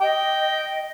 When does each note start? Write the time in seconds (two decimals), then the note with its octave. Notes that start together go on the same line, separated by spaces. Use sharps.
0.01 D#5 G5